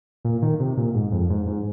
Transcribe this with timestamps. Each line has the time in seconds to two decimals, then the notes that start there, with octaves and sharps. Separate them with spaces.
0.25 A#2
0.42 D#3
0.60 C3
0.77 A#2
0.94 G#2
1.12 F2
1.30 G#2
1.47 G#2